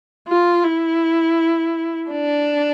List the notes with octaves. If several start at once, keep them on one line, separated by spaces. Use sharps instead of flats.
F4
E4
D4